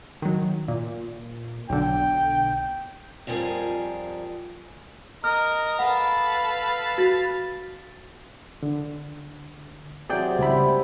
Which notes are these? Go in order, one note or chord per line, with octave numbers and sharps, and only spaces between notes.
D#3 F#3
A#2
B1 D3 G5
F2 F3 G3 B3 G#4 A#4
A#4 D#5 F6
A4 B4 F5 F#5
F#4 A6
D3
C3 F#3 G#4 D5 G5
C#2 C3 G3 E4 B5